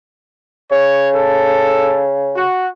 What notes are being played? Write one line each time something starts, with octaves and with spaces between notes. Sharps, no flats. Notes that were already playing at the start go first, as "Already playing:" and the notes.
C#3 C#5
A4
F#4